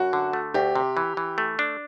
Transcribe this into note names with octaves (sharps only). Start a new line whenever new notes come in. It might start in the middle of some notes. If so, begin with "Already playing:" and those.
Already playing: F#2 F#4
D3
A3
D2 G4
C3
E3
E3
A3
D4